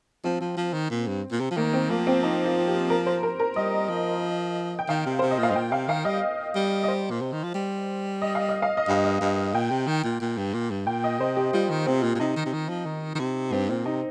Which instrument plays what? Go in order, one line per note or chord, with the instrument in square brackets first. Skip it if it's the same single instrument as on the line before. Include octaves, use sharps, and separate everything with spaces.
[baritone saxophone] F3 [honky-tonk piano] C4
[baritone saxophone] F3
F3
D#3
A#2
G2
A#2
C3
F3
[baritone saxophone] D#3 [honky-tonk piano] A#3
[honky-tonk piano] C4
[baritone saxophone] F3 [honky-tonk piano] A#3
[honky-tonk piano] C4
D#4
F4
G4
A#4
C5
A#4
A#4
[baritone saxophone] G3 [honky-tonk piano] D#5
[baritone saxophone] F3
[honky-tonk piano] G5
[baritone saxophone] D#3 [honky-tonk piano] F5
[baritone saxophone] C3
[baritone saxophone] C3 [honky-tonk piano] C5
[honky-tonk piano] D#5
[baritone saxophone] A#2 [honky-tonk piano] F5
[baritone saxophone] G2
[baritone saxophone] A#2 [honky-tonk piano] G5
[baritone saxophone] C3 [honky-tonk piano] F5
[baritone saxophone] D#3 [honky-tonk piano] F5
[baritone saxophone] G3 [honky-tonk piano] D#5
[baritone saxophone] G3
[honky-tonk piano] D#5
C5
[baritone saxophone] A#2
C3
D#3
F3
G3
[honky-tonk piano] D#5
F5
D#5
F5
D#5
[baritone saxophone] G2 [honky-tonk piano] F5
[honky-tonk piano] D#5
[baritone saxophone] G2
[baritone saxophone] A#2 [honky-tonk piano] G5
[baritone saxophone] C3
D#3
A#2
A#2
G2
A#2
G2
[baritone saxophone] A#2 [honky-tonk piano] G5
[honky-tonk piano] D#5
[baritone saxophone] C3 [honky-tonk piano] C5
[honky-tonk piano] G4
[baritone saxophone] G3 [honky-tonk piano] F4
[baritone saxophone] D#3
[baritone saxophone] C3 [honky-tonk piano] C4
[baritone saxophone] A#2
A#2
[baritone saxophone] C3 [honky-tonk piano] D#4
[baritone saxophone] D#3
C3
D#3
F3
D#3
D#3
C3
[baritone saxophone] G2 [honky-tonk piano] C4
[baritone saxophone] A#2 [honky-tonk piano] C4
[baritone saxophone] C3 [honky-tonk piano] D#4